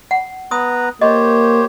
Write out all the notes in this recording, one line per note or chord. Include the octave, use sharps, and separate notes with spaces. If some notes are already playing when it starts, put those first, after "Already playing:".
F#5
B3 B4 A#5 D#6
A#3 G4 C5 C#5 D#5